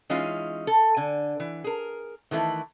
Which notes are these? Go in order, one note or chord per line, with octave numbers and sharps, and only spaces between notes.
E3 G#3 C#4 D#4 F4
A4
D3 G#5
E3
G#4 A#4
D#3 E3 A3 E4